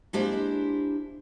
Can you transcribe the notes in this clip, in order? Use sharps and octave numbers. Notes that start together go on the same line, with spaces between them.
G#3 A#3 D4 E4 G4 C5